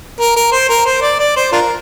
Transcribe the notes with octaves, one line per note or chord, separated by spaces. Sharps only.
A#4
A#4
C5
A#4
C5
D5
D5
C5
D4 F4 A#4